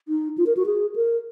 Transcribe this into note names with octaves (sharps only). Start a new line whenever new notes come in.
D#4
F4
A#4
F#4
G#4
A#4